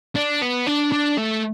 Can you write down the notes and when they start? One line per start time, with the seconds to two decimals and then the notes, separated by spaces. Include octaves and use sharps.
0.15 D4
0.42 B3
0.67 D4
0.93 D4
1.18 A3